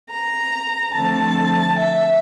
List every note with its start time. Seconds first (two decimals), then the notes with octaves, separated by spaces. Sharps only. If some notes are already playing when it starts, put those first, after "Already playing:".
0.10 A#5
0.93 D3 F3 A3 C4 A5
1.78 E5